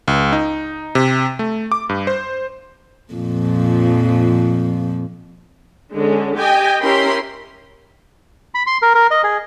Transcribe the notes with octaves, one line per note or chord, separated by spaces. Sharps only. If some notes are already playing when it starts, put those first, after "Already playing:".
C#2
D#4
C3
A3
D6
G2
C5
F2 A#2 F3
D3 G#3 C#4
G4 D#5 G5 G#5
C#4 E4 G4 A#4 B5 C6
B5
C6
A#4
A#4
D#5
G#4